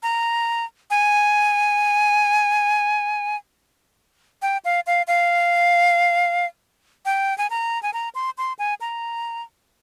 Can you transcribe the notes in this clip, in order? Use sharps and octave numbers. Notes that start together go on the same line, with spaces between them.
A#5
G#5
G5
F5
F5
F5
G5
G#5
A#5
G#5
A#5
C6
C6
G#5
A#5